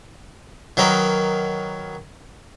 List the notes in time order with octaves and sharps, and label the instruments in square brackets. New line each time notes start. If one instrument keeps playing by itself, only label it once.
[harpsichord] D#3 F#3 A#4 B4 D#5